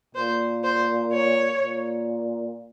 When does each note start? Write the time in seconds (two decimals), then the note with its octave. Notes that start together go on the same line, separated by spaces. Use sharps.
0.15 A#2 C5
0.64 C5
1.13 C#5
1.63 A#2